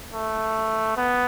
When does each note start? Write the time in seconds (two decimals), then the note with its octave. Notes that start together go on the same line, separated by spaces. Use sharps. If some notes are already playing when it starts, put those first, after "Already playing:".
0.14 A3
0.97 B3